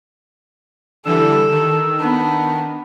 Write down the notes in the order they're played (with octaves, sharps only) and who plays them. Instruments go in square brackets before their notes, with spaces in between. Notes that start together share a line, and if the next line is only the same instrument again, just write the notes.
[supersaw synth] D3 E3 G3 [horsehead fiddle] A4 [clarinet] E6
[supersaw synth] D#3
[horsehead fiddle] B3 [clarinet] D4